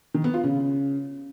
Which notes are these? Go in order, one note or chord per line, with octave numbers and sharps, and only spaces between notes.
D#3
B3
F4
C#3